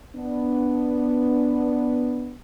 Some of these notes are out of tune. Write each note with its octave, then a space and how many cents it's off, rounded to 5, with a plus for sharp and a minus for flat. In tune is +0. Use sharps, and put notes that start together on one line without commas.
B3 +0 D4 +0